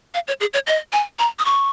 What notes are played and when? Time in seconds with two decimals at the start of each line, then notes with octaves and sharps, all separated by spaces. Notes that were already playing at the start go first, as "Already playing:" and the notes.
0.14 F5
0.28 C#5
0.41 G#4
0.54 C#5
0.67 D#5
0.93 G#5
1.19 A#5
1.39 D#6
1.45 C#6